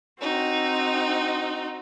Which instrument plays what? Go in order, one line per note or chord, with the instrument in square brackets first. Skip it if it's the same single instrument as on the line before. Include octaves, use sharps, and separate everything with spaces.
[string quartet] C4 D#4 F#4